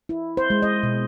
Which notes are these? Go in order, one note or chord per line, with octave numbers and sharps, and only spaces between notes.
E4
C5
G#3
D#5
B2